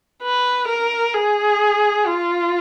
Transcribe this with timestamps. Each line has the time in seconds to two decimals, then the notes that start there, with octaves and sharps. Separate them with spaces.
0.22 B4
0.68 A#4
1.14 G#4
2.06 F4